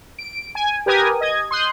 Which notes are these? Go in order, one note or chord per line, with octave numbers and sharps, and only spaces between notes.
D7
G#5
G4 A#4 B4 G#5 D#6
D#5 G#6
C6 D#6 F#6 G6